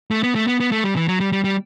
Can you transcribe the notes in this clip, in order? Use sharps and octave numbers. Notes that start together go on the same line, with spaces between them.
A3
B3
A3
B3
B3
A3
G3
E3
F#3
G3
G3
G3